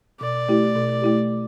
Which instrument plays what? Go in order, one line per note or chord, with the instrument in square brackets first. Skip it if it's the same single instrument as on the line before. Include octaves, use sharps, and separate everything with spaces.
[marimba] B2 [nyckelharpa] D5
[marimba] A3 E4 G4
B2
A3 E4 G4